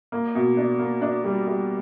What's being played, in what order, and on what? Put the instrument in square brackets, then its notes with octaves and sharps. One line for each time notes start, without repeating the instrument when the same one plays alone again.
[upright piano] A#3
B2
D4
A#3
D4
G3
G3